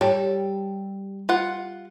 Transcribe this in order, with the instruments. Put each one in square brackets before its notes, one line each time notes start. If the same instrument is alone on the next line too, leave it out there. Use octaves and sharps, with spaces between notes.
[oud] G3 [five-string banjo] A4 [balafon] C#5 G5
[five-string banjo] F4 F#5